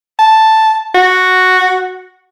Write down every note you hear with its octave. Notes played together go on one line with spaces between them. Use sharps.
A5
F#4